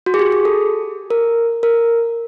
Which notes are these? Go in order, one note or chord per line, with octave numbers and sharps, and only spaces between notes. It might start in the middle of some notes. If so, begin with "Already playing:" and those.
F#4
G#4
G4
G#4
A4
A#4
A#4